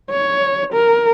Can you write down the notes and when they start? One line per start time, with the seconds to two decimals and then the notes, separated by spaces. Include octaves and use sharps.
0.10 C#5
0.73 A#4